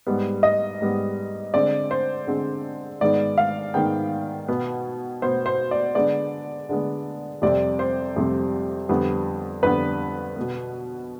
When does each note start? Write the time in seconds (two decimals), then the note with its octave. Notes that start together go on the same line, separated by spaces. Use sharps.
0.07 G#2 G3 B3
0.43 D#5
0.81 G#2 G3 B3
1.54 D3 G#3 C4 D5
1.91 C5
2.27 D3 G#3 C4
3.01 G#2 D#3 G#3 B3 D5
3.38 F5
3.74 G#2 D#3 G#3 B3 G5
4.48 B2 B3
5.22 B2 B3 C5
5.46 C5
5.71 D5
5.95 D3 G#3 B3 D5
6.69 D3 G#3 B3
7.42 F2 C3 G3 C4 D5
7.79 C5
8.16 F2 C3 G3 C4
8.89 F2 D3 G3 B3
9.63 F2 D3 G3 B3 B4
10.36 B2 B3